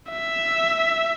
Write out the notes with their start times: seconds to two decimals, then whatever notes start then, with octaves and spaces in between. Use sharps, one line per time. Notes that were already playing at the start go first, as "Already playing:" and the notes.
0.11 E5